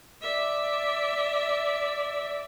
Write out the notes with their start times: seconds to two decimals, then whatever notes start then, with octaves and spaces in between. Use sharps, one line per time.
0.22 D5 E5